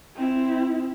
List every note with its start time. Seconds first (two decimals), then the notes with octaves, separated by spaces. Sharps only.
0.16 C4 E4